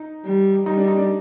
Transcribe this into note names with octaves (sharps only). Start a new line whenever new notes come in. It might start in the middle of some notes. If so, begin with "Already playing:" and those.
Already playing: D#4
G3
G3 D#4
D4
D#4
D4